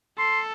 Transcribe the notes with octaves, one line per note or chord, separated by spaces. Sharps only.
A4 C6